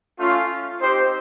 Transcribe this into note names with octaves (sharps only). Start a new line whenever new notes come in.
A3 C#4 F4
C4 D#4 G4 C5